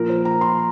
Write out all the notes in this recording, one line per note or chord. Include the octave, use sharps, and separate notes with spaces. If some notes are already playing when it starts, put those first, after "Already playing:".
Already playing: A#2 F3 A#4
C5
A#5
C6